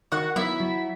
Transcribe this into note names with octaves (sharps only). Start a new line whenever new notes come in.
D#3 F#4 F#5
F#3 B3 E4 E5
F#3